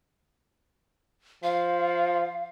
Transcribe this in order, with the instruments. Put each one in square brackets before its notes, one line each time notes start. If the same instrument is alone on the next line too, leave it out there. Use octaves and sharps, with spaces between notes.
[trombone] F3 [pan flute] F5